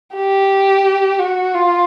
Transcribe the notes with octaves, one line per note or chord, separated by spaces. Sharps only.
G4
F#4
F4